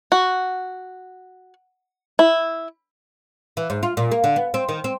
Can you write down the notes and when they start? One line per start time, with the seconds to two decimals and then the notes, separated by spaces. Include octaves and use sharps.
0.12 F#4
2.19 E4
3.57 E3
3.70 G#2
3.83 F4
3.97 A#2
4.11 A#3
4.24 D3
4.36 B3
4.54 C4
4.69 D#3
4.84 C4